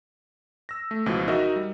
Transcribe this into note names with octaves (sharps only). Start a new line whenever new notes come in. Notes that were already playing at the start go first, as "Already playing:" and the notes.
E6 A#6
A3
C#2 B2 E3 F3
D#4 F#4 A#4 D#5 E5
G3